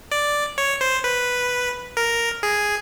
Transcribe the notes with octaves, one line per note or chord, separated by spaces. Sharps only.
D5
C#5
C5
B4
A#4
G#4